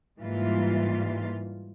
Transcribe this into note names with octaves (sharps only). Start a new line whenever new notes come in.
G#2 E3 G3 A#3 F4